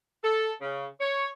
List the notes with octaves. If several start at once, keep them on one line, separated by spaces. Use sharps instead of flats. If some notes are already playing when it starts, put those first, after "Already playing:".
A4
C#3
C#5